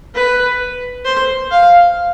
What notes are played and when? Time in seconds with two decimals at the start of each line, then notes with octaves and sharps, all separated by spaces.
0.15 B4
1.05 C5
1.51 F5